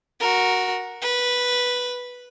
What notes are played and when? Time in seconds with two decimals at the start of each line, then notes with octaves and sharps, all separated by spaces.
0.20 F#4 A#4
1.02 B4